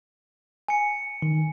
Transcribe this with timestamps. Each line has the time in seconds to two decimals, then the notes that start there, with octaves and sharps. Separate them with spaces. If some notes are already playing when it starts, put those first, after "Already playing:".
0.68 G#5 C#7
1.22 D#3